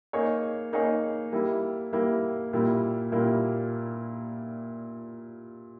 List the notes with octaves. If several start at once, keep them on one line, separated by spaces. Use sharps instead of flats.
A#3 D#4 G#4 C#5
A#3 D#4 G#4 C#5
G3 A#3 E4
G3 A#3 E4
A#2 G3 A#3 E4
A#2 G3 A#3 E4